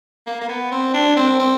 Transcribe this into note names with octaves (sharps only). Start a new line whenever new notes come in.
A#3
A#3
B3
C4
D4
C4
C4